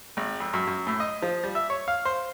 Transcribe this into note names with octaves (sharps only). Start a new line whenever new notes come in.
G#1
F2
F#2
F#2
A2
D#5
F3
G3
E5
C#5
F5
C5